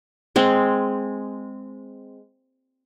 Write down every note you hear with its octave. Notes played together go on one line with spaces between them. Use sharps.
G#3 C4